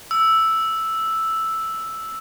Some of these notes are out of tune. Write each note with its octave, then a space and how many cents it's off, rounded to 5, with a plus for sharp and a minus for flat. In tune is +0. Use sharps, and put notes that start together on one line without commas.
E6 +0